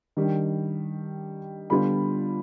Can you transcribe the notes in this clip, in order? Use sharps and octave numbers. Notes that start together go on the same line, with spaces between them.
D#3 G3 D4
D3 G3 B3 D4 F4 B5